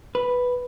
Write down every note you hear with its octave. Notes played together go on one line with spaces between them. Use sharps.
B4